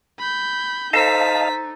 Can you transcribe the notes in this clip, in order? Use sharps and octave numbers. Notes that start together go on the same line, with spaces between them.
B5 G6
D#4 A4 C5 D#5 F5 A5 A#5 B6